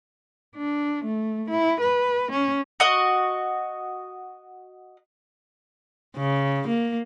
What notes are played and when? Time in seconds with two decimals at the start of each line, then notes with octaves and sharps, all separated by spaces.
0.56 D4
1.05 A3
1.50 E4
1.81 B4
2.32 C#4
2.80 F#4 D#5
6.16 C#3
6.68 A#3